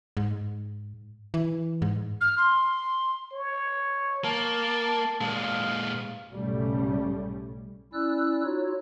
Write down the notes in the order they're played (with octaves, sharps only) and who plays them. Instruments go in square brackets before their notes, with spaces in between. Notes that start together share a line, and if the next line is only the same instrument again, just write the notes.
[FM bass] G#2
E3
G#2
[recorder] F6
C6
[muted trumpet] C#5
[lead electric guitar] A#3 [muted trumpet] A5
[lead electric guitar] A#2 G#3 [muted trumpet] F5
[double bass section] B1 G#2 C#3 G3 A3 C#4
[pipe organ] C#4 E4 D5 E6 F#6
D#4 F4 F#4 C#5